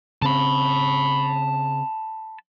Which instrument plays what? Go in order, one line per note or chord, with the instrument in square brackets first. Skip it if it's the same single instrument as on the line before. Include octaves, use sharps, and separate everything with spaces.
[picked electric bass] C#3 C4 [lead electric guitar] A5 B5